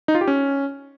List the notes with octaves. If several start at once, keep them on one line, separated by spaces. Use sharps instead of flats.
D#4
F4
G4
C#4